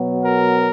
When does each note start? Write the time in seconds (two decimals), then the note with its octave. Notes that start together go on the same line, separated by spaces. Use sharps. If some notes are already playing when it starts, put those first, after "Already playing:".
Already playing: B2 F#3 B3
0.23 A#4